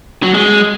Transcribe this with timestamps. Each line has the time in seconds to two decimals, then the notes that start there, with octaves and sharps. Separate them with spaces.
0.23 F#3
0.34 G#3